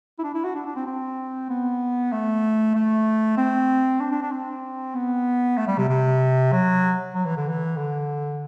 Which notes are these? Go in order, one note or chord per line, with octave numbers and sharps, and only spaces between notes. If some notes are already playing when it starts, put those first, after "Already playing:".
E4
D4
E4
F#4
D4
D4
C4
C4
B3
A3
A3
C4
D4
D4
D4
C4
B3
A3
G3
C3
C3
F#3
F#3
E3
D3
E3
D3